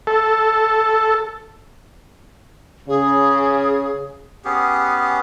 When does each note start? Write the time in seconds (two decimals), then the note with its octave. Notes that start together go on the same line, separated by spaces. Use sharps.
0.07 A4
2.88 C#3 G#4
4.45 B3 C#4 G4 G#4